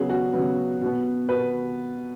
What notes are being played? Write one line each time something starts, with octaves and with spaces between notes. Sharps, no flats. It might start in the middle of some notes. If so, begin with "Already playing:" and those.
Already playing: C#3 F#3 B3 G#4
F#4
C#3 F#3 B3
B2 B3
B2 B4